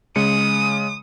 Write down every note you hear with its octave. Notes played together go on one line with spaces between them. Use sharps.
C#3 G#3 D#6 C#7